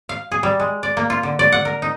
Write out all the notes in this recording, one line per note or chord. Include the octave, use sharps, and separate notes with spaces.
F5
G#4
G3
G#3
D5
A#3
F4
D3
D5
F#5
A#4
D#4